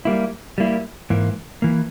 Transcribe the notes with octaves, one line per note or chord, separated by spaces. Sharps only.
G3 A#3 E4
G3 A#3 E4
G#2 E3 A#3
E3 A#3